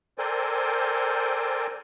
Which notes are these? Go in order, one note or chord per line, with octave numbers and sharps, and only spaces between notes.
A4 A#4 C5 D5 G5 G#5